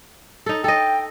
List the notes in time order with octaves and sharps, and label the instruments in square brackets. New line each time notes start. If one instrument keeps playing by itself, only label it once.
[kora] D#4 A4
[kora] A4 D#5 [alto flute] G5